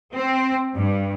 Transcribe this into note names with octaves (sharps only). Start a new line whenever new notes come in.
C4
G2